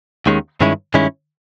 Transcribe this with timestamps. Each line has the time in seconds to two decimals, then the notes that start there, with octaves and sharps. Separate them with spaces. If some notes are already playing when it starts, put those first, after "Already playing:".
0.26 D#2 D#3 G#3 C#4
0.61 G2 D#3 G#3 C#4 E4
0.94 G2 D#3 G#3 C#4 E4